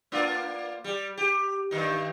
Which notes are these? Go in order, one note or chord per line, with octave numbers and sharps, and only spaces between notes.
A#3 D4 F4
G3
G4
G2 D#3 D#4